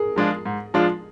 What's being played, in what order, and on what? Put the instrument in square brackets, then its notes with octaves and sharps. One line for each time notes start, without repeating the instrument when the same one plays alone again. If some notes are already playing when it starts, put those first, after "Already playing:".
Already playing: [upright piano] G#4 A#4
[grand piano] F3 G#3 D4 F4
G#2
F3 G#3 D4 F4